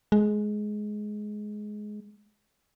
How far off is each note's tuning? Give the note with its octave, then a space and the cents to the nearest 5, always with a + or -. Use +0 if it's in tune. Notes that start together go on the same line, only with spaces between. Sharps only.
G#3 +15